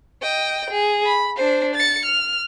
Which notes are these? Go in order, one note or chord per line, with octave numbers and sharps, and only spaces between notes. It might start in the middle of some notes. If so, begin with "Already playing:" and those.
D#5 G5
G#4
B5
D4 C5
A6 C#7
F6